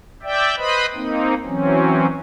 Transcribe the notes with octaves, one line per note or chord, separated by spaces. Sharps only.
D5 E5 G5
B4 C5 D#5 B5
A#3 C4 D#4
E3 F#3 C4 C#4